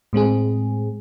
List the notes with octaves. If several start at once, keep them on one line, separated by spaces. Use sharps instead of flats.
A2 G#3 C4 G#4